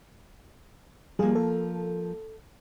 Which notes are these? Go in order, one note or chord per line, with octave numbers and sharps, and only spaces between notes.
F3 G3 A#3 G#4
A4